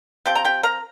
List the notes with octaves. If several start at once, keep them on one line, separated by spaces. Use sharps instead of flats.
F3 C4 G4 G5
A#5
G4 G5
A#4 A#5